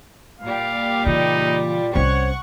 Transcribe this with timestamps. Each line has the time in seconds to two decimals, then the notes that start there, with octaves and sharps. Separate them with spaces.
0.41 A#2 G3 F5
1.06 C#3 E3 D#4 F4
1.95 C2 C#4 C5 C#5 F#5 C#6